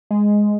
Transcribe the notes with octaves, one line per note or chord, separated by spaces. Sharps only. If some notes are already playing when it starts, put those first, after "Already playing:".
G#3